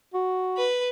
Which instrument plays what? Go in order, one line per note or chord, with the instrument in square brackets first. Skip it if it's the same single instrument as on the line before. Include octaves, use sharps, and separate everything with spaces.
[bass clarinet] F#4
[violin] B4